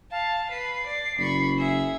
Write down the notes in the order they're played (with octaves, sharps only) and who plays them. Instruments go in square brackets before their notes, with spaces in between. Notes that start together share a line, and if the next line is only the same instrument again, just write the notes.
[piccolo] F5 [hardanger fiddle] A5
[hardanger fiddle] B4 [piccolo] C7
[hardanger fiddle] D5
[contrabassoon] F#1 [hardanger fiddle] B5 C#6
[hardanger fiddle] G#4 E5